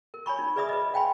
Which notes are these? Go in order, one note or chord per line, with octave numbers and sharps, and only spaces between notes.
A#4
C#5 G#5 B5 C#6
D#4
G#4 B4 D5 E5 B5 D#6
B4 D#5
F5 G5 G#5 B5 C6